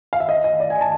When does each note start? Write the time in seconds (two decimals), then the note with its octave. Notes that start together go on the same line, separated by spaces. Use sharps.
0.13 F5
0.20 E5
0.29 D#5
0.44 D#5
0.60 D5
0.70 G#5
0.81 A5